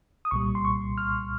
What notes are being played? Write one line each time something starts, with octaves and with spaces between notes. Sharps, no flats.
D#6
C2 A#2 G3 C#6
C6
C#6
F6